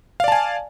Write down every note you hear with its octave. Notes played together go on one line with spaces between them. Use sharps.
D5 F5 G#5 A5